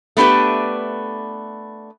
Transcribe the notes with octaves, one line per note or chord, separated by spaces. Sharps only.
A3 B3 D4 G4 B4